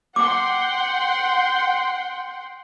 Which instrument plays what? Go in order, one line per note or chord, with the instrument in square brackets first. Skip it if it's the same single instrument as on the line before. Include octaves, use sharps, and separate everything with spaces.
[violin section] F#5 G5 C6 [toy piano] D6